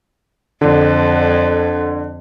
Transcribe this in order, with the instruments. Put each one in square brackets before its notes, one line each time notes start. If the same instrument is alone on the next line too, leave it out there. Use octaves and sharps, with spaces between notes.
[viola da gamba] F2 [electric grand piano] D3